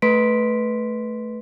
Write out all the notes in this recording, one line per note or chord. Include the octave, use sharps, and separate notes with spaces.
A3 B4 C6 B6 D7